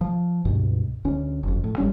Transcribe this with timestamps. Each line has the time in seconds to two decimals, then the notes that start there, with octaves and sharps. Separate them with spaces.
0.01 F3
0.45 C#2 G2 B2
1.05 D2 C#4
1.43 F#1 F2
1.64 A2
1.78 G#1 G3 C#4